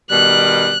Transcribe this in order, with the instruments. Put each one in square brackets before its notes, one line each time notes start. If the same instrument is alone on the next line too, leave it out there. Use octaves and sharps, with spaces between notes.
[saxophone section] B2 D#3 G3 [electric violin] F#6